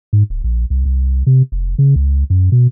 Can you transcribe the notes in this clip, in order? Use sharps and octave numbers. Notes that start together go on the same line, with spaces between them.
G#2
D1
A#1
C2
C2
C3
F1
C#3
C#2
F#2
B2